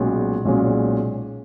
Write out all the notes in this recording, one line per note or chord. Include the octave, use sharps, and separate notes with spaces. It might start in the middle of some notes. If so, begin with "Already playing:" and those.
Already playing: B1 A#2 G#3 C#4
B1 A#2 G#3 C#4